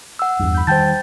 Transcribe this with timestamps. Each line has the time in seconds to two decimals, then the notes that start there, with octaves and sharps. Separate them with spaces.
0.19 F#5 E6
0.40 E2 G2
0.54 B5 G6
0.67 D#3 G3 C5 G5 A5 G6 A6